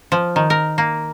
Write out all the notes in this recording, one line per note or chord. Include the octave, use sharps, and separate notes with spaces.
F3
D#3
A#4
A#3